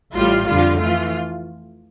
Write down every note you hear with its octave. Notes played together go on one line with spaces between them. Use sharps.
A1 A2 G3 F4
F2 D3 G3 F4
E3 A3 F4